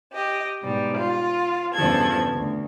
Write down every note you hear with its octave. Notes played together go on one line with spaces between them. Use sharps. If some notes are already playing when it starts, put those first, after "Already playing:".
G4 D#5
G#2 B2 G3
F4
E2 G2 C#3 F3 A4 G#6
D2